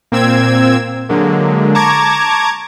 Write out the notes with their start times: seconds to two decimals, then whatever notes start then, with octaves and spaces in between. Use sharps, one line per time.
0.12 A#2 C4 E6 G#6
1.09 D3 F#3 G#3 A#3
1.75 A5 A#5 C#6 D6 G#6